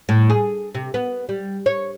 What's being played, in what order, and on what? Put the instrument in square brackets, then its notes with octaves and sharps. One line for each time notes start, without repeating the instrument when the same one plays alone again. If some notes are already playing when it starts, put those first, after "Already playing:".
[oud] A2
G#4
C3
B3
G3
C#5